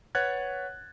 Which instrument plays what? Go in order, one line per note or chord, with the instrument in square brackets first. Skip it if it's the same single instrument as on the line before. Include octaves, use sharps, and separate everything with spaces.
[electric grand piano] B4 C#5 F#5 F#6 G#6 A6